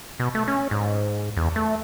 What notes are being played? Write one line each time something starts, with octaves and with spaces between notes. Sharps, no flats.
B2
A3
C#4
G#2
E2
A3